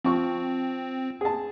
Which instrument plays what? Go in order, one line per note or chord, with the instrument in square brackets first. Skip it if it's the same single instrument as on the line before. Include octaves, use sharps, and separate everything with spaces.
[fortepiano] F3 C#6 [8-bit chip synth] C4
[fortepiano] G#4 A5